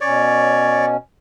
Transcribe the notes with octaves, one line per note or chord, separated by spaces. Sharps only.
B2 C#4 C#5 D5